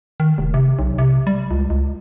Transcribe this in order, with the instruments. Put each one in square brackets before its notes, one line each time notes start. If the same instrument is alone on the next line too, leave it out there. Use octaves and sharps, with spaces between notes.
[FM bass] D#3
F1
C3
B1
C3
G3
C#2
C#2